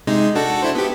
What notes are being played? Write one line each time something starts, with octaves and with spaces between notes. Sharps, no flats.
C3 G#3 D#4
D4 F#4 A4
D4 E4 C5
B3 G4